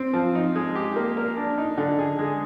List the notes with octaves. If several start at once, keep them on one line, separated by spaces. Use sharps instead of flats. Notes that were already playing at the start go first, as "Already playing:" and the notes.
Already playing: C4
F3
D#4
G#3
G4
A#3
A#4
D4
D#4
D3
G#4
G#3